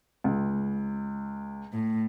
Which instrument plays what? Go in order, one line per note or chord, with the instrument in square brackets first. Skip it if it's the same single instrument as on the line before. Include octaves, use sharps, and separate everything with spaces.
[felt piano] C#2
[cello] A2